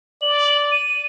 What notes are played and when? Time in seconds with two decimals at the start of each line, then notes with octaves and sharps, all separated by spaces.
0.22 D5 F#7
0.72 D#7